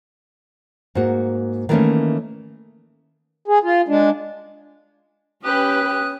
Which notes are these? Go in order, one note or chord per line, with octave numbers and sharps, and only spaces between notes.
G#2 A#3 F#4
D#3 E3 G3 A3 A#3 C#4
G#4
F4
G#3 D4
C#4 G4 B4 D#6 F#6